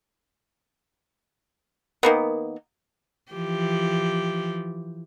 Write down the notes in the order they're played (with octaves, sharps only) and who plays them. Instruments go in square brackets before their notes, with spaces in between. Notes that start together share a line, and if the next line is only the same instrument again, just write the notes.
[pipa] D#3 A#3 B3
[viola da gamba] E3 F3 G4